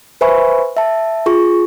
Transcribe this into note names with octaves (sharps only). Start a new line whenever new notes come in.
B4 C5 E5 G#5 B5 C#6
E5 A5
F4 G#4 C#6